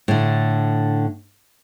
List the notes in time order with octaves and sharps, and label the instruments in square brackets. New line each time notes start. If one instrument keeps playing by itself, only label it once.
[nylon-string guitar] A2 D3